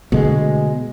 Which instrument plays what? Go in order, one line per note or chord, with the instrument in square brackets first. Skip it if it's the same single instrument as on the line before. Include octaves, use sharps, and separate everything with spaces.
[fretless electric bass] B2 G#3 [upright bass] D3 A3